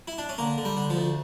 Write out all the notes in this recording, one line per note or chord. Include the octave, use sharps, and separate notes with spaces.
E4
D4
C#4
D3 A#3
D3
G3
D3
F3
D2